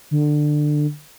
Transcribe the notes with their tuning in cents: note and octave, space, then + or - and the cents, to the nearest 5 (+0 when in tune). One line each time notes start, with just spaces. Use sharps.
D3 +20